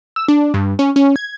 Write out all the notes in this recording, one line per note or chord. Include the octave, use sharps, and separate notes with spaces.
E6
D4
G2
C#4
C#4
G#6